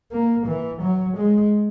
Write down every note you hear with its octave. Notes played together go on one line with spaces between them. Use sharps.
A#3
E3
F#3
G#3